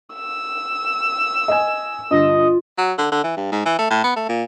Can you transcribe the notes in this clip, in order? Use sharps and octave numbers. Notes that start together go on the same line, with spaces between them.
E6
D#5 G#5
G2 D3 F4 D#5
F#3
D3
D3
E3
G2
G#2
E3
A3
A2
B3
A3
A#2